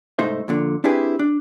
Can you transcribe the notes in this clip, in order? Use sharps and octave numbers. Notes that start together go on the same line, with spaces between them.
C2 G#2 A3 D#4 C5 E5
F2 A#2 D3
C4 D4 E4 G4 G#4 B4
D4